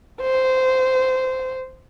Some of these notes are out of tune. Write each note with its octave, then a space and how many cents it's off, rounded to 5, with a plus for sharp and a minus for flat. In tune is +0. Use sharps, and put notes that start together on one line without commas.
C5 -15